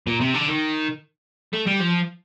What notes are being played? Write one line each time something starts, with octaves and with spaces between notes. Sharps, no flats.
A#2
C3
D3
D#3
A3
G3
F3